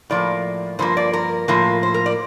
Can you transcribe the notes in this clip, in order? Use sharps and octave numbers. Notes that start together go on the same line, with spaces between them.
A2 F3 A#3 D5
G2 F3 A#3 C5
D5
A#4
A2 F3 A#3
C5
A#4
D5